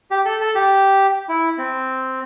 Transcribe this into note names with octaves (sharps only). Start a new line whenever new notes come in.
G4
A4
A4
G4
E4
C4